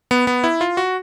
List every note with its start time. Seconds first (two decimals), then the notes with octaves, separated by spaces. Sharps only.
0.11 B3
0.27 B3
0.44 E4
0.61 F4
0.77 F#4